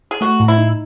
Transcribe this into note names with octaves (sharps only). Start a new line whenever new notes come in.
G#4
A3 F#4
A2
E4
D#4